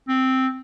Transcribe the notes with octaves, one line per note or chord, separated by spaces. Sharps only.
C4